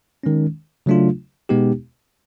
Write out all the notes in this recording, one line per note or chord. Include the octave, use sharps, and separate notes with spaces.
D#3 G#3 C#4
C#3 F#3 A3 D4 F4
B2 G#3 B3 D#4 G4